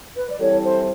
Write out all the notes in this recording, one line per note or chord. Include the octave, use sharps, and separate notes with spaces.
B4
D5
E3 G3 C4 E4 A4 C#5
C5